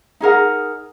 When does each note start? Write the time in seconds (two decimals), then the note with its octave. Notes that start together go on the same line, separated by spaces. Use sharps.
0.20 D#4 G#4 A#4 F#5